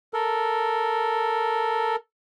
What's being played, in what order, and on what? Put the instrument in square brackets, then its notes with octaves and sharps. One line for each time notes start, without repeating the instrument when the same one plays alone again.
[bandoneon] A4 A#4